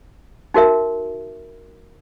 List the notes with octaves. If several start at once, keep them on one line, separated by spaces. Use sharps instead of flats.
D#4 F#4 A#4 E5